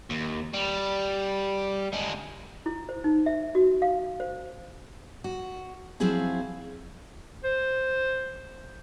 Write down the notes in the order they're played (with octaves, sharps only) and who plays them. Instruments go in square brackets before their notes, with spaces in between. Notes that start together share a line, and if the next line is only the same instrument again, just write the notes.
[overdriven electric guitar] D#2
G3
D3 G#3
[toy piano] E4
C5
D#4
E5
F#4
F5
C5
[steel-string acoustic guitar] F#4
F3 F#3 C4 E4 G#4 F5
[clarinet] C5